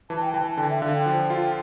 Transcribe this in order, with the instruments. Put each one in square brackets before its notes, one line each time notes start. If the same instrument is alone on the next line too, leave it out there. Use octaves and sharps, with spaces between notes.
[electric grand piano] E3 [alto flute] A5
[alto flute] G5
[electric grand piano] E3 [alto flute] A5
[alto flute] A5
[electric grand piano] D3 [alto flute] G5
[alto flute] E5
[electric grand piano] D3 [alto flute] F5
[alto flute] G5
[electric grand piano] F3
F4